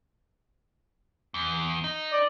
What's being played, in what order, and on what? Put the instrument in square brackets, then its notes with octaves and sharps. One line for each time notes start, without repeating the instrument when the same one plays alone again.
[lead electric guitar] E2
D#4
[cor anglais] D5